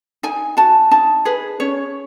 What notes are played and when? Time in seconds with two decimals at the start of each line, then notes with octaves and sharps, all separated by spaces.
0.23 D#4 G#5
0.57 F#4 A5
0.91 D#4 A5
1.25 G#4 B4
1.60 C#4 C#5